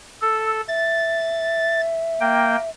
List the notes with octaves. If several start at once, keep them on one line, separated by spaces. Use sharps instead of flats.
A4 E6
E5 A6
A#3 G5